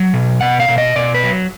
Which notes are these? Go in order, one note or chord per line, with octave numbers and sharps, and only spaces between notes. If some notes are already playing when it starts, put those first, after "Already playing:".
Already playing: F#3
B2
B2 F#5
F5
B2
D#5
B2 D5
B4
F#3